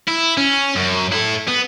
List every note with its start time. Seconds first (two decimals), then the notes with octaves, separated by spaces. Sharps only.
0.08 E4
0.37 C#4
0.76 F#2
1.12 E4 A4
1.48 B3